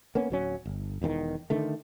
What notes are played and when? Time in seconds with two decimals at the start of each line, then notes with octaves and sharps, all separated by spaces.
0.15 A#3 B3 C#4
0.30 D1 F#3 C#4
0.66 G1
1.02 E1 E2 A2 D#3
1.50 D3 D#3 A3